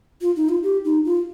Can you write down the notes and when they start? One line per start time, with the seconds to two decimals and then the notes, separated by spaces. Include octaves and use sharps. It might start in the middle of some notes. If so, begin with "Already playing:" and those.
0.21 F4
0.36 D#4
0.49 F4
0.63 G4
0.85 D#4
1.05 F4